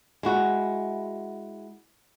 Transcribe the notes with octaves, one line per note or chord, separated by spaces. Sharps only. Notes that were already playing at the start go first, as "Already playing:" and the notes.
G#3 E4 F#4